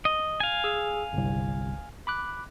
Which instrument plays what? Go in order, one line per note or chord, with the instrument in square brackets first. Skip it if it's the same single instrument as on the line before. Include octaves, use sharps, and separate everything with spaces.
[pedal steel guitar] D#5
F5 G#5
[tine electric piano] G#4 E6
G1 C2
B5 D6 F#6